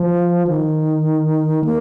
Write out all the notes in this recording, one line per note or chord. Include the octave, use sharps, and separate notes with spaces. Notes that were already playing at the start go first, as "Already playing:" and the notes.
Already playing: F3
D#3
A#3